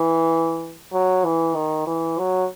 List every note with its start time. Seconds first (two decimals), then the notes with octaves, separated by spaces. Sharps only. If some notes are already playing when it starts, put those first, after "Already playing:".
Already playing: E3
0.92 F#3
1.24 E3
1.55 D#3
1.87 E3
2.18 F#3